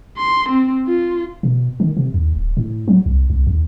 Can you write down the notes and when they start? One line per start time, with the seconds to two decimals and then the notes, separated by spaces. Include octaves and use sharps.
0.17 C6
0.49 C4
0.87 F4
1.43 B2
1.80 D#3
1.97 C3
2.14 D#2
2.36 D1
2.57 A2
2.88 F#3
3.06 C2
3.30 C2
3.47 D#2